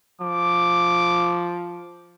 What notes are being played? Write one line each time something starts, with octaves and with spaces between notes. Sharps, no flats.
F3 D6